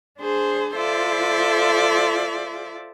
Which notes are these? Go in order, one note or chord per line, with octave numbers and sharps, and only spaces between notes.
D4 G#4 C5
F4 A4 C5 D5 E5